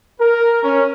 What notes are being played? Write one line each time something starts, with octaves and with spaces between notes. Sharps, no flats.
A#4
C#4